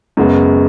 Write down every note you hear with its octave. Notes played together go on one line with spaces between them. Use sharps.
F#2 C#3 G#3 B3